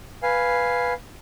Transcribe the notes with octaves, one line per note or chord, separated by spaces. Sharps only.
B4 F5 G#5